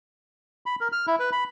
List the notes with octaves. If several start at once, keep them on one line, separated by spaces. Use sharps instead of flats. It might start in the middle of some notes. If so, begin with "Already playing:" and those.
B5
A#4
F6
E4
B4
B5